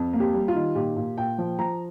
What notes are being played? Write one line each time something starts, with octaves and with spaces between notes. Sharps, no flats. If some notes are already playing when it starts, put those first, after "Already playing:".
Already playing: F2
A#3
G4
G3
F4
D#3
A#2 G4
A#2
A#2 G5
F3
F3 A#5